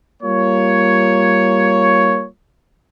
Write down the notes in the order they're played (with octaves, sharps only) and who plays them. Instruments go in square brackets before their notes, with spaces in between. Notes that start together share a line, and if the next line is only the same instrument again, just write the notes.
[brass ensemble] G3 A#3 F4 C#5